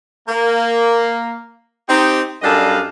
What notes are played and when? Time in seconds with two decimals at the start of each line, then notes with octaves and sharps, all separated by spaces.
0.29 A#3
1.88 C4 D#4 G4
2.42 F#2 G3 D4 A4 D#5 F5